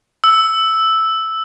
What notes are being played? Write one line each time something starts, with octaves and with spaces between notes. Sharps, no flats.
E6